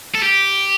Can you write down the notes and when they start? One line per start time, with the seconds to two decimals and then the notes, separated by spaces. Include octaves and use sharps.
0.14 A4
0.23 G4